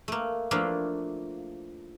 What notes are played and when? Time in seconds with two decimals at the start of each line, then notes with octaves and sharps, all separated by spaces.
0.08 A3 A#3
0.51 F3 A3 A#3 D4 E4 F5